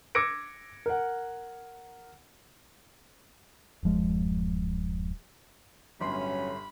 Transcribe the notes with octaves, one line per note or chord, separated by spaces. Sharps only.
D6 E6 G#6 A#6 C#7 D7
A#4 F#5
D1 F#2 F3 G#3
G1 A2 F#3 C#4 B5 C6